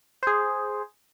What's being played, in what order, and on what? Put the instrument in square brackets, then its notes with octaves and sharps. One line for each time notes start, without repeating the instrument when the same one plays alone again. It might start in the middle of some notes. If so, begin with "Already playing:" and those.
[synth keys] G#4 C5